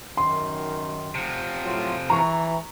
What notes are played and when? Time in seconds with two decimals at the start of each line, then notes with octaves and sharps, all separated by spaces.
0.17 F#2 D#3 C6
1.15 C3 F3
1.65 A2 F#3 F4
2.10 E3 A#5 C#6